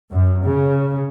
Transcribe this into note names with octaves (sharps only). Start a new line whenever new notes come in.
F#2
C#3